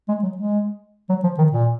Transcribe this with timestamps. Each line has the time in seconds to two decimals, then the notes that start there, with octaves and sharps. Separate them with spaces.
0.09 G#3
0.23 F#3
0.37 G#3
1.09 F#3
1.23 F3
1.38 D#3
1.52 A#2